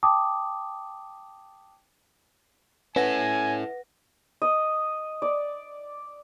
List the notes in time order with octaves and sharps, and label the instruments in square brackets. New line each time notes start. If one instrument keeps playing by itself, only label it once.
[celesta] G5 A5 D6 D#6
[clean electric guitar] C#4 [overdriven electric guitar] E4 A4 [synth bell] B4 F#5 A#6 [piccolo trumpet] G#5
[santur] D#5
D5